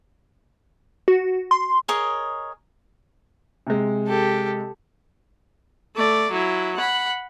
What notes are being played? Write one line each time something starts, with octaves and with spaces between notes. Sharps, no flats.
F#4
C6
G#4 A#4 C#5 D#5
C3 G#3
G4 A4
A3 D5
F#3 E4
F#5 B5